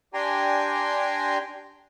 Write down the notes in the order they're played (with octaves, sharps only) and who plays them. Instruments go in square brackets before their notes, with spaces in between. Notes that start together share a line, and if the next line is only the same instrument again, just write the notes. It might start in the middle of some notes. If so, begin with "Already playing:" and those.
[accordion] D4 G4 G5 G#5 A#5 C6